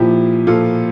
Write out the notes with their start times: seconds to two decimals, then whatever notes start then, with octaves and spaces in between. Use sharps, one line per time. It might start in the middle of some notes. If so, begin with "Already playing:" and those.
Already playing: A#2 F3 E4 G4
0.47 A#2 F3 F4 A4